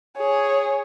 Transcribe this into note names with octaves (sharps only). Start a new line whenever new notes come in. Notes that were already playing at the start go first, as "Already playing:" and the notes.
G#4 C#5